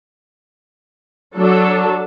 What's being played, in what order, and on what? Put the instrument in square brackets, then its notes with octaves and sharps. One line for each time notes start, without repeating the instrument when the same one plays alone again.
[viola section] F#3 D4 A4